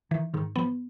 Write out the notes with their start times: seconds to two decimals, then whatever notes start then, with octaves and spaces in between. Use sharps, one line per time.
0.11 D#3 E3
0.34 G#2 D#3
0.56 F3 B3